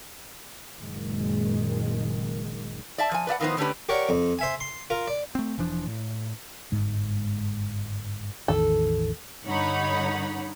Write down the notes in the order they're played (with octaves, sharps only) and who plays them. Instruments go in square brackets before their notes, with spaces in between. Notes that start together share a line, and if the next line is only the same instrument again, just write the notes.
[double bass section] F#1 A#2 D#3 G#3
[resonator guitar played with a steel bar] D5 E5 A5
F3 G#5
B4 D5 E5 F#5
A2 D#3 F3 B3 D#4 C5
D3 A3 C#4 D4 G4 B4
[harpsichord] G4 A#4 C#5 D5 F#5
F2
C5 E5 G#5
C6
F4 A#4
D5
[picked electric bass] A3 C4
E1 E3 F3 D4
A2
[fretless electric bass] G1 G#2 G#3
[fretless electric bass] A1 E2 D#3 [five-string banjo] A4
[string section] G2 D3 D#4 C#5 F#5 B5